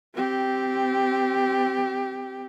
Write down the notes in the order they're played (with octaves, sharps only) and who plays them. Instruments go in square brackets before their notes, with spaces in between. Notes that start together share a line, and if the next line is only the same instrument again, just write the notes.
[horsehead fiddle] C4 G4